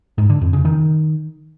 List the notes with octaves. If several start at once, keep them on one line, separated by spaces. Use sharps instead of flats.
G#2
D3
F2
C#3
D#3